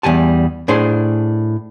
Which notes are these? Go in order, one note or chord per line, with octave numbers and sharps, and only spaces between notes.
E2 G#2 G3 G#5 A5
A2 D4 G#4 C5